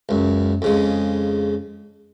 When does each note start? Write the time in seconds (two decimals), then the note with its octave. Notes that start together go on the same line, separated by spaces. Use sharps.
0.09 C#2 F#2
0.62 F2 C#3 G#3